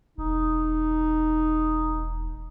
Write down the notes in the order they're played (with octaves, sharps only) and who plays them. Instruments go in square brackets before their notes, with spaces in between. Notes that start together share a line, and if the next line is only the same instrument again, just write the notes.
[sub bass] E1 [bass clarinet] D#4